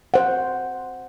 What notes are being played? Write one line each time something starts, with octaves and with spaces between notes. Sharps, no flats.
C5 F#5